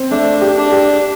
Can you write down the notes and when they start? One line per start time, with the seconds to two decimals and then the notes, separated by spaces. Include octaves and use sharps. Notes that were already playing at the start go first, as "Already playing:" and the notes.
Already playing: C4
0.11 A3 D4
0.41 G4
0.57 D4
0.71 G4